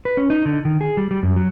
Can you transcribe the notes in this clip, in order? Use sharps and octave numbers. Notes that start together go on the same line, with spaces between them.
B4
C#4
D#4
D3
D#3
G#4
G3
G3
F#2
F#3